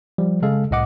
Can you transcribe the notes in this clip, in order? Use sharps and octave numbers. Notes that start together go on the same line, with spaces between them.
F3 G3
C#3 G#3 A4 F5
C2 A2 D#5 F#5 D6